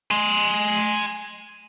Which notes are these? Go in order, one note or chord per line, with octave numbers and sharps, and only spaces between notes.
G#5 C6